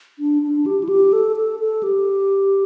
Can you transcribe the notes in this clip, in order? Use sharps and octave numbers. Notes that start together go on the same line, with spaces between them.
D4
D4
G4
E4
G4
A4
A4
A4
G4